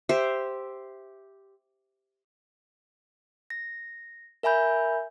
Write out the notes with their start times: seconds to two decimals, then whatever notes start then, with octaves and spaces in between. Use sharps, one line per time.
0.09 G4 C5 E5
3.50 A#6
4.43 A#4 E5 G#5 B5 G6